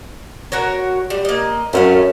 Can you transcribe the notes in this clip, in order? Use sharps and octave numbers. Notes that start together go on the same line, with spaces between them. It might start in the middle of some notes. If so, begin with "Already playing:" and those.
F#4 A#4 C#5
G3
A#3 D#5
F#2 A3 C#4 F5